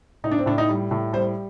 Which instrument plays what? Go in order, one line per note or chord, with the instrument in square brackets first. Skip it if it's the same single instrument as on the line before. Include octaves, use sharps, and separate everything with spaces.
[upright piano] A2 D#4
D4
C4
A2 D4
D#4
G3
A2
G3 C5